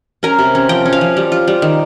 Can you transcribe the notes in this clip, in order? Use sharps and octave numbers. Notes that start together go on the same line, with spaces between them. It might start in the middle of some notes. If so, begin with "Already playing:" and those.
C#4 A#4
C3
C#4
F3 G5
C#4
F5
F3
G3
F4
G3
D#3